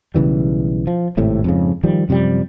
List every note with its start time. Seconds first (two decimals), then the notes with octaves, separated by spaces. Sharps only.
0.14 B1 C#3 E3 G3
0.87 F3
1.17 G#1 A2 C3
1.44 F2 G#2 C#3
1.83 D#3 F3 G3
2.09 F#2 C3 F3 G3